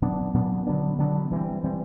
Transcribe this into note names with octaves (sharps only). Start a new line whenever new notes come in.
A#2 F#3 B3 D4
A#2 F#3 B3 D4
D3 F#3 B3 D4
D3 F#3 B3 D4
E3 G3 C4
E3 G3 C4